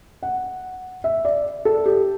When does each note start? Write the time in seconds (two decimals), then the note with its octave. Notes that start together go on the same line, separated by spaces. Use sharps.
0.23 F#5
1.04 E5
1.25 D5
1.65 A4
1.86 G4